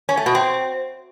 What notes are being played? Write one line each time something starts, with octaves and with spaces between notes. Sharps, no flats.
C#4
A3
B2
C4